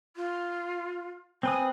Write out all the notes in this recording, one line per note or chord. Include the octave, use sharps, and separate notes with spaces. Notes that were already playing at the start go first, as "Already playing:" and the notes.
F4
C4 B4 G#5 D#6